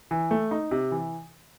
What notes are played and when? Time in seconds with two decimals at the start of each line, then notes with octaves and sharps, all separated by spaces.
0.11 E3
0.31 A3
0.51 D#4
0.71 C3
0.92 E3